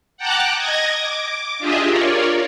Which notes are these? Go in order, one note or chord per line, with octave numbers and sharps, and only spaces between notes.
F#5 G5 A5 A#5 D6 F#6
D#5 G#6 A#6
D6
D4 F4 G4 G#4 D#5 E5
F4 A#4 C#5 D5